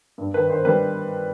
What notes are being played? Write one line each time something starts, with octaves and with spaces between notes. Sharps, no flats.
G2
D#3 B4
D#3 C5
G3 B4